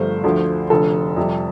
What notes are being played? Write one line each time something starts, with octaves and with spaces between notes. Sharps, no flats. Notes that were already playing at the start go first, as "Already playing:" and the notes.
Already playing: G1 G2 F3 A3 C5
D2 D3 F3 A3
F1 F2 D3 A4
F2 C3 G3